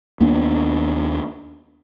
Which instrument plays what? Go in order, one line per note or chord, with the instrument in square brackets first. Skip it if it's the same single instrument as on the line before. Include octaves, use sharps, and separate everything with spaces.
[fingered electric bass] D#2 A#3 B3 D4